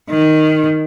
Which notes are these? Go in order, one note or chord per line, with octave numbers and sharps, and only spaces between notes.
D#3